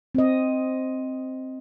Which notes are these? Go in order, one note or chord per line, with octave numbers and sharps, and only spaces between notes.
C4 D#5